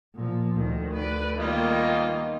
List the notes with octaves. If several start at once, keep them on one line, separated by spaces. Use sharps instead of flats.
A#2 F3
D2 D#3
B4 D5
D#3 G3 A#3 B3 D#4 F4 D#5 F5